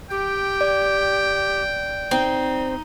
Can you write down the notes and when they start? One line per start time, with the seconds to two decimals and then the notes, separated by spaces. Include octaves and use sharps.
0.10 G4 G5
0.61 D5
2.11 C4 D#4